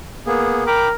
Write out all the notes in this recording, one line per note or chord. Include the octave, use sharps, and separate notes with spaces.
A#3 B3 G#4
A#4 G5 B5 D6